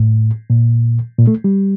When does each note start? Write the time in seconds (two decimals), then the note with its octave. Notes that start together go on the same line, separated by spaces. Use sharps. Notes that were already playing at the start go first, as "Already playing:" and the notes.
Already playing: A2
0.50 A#2
1.19 A#2
1.27 A3
1.44 G3